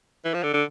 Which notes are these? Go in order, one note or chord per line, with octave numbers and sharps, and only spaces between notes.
E3
F3
D3
D3